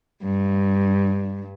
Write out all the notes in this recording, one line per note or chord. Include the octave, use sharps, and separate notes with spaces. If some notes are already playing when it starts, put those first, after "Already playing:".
G2